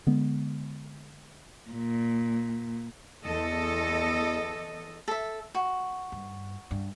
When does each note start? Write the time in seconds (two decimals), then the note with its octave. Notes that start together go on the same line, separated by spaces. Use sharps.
0.07 D3 G#3 B3
1.70 A#2
3.25 E2 A4 D#5
5.08 A4 E5
5.55 F#4
6.12 G2
6.71 G2